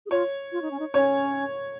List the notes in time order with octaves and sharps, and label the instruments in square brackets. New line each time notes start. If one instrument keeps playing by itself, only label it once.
[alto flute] G#4
[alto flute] F4 [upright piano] C#5
[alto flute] F4
D#4
C#4
D#4
[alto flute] C#4 [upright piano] C#5